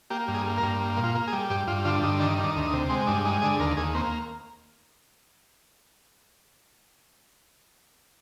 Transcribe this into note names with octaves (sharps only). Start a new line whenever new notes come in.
A#3 G4
G2
G#4
A#3
A#4
G2
A#3
A#2
F4
A#3
G#4
G3
G2 G4
G2 F4
D3 F4
G2 D#4
D#3 D4
D#3
D4
D2
D#4
C3
G#3 C4
G2 D4
G#3 D#4
D3 G#4
D#2 A#4
D#2 G#4
A#3 C4